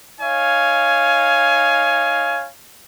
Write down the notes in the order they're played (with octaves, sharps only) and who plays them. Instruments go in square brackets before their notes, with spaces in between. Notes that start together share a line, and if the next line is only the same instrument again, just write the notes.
[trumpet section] D#4 C#5 F5 G#5